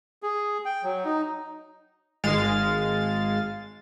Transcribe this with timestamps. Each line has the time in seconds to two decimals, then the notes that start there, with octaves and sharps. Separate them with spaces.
0.23 G#4
0.65 G5
0.84 F#3
1.05 D#4
2.24 G#1 G#3 F5 A6